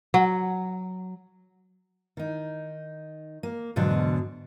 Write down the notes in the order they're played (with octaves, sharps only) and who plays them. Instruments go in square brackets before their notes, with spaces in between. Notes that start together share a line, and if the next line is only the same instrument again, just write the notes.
[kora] F#3
[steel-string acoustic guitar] D#3 D#4
A#3
E2 G#2 B2 D3 F#3